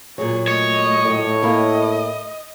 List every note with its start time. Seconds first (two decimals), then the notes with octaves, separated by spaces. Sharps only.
0.18 A#2 F#3 G#4 C#5
0.48 A3 C#5 D#5
1.02 A2
1.43 A#3 E4 A#4 D#5